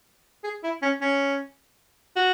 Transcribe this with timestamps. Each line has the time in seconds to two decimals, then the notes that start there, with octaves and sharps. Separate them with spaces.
0.44 G#4
0.63 E4
0.82 C#4
1.01 C#4
2.16 F#4